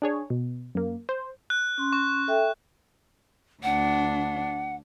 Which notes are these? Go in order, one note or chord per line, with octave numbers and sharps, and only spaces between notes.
D4 G#4 C#5
B2
F#2 A#3
C5
F#6
C#4 C6
C#6
A4 E5 G5
D2 D4 F#5